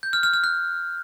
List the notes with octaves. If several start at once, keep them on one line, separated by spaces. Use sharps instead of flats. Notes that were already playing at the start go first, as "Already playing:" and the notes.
G6
F6
F6
F6
F#6